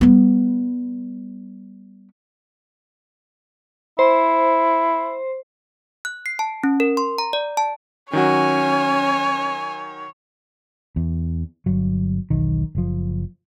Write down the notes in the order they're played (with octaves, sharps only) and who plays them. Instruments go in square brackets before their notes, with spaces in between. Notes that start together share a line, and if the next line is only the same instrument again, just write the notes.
[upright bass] G3 B3
[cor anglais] E4 [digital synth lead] C5
[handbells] F#6
C7
A5
C#4
A#4
C6
A#5
D5
A5
[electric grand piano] D#3 F#3 F#4 [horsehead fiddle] C#4 [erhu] C#5 [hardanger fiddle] G#5
[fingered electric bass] E2
G1 F#3
E1 B1 D#3
F#1 F3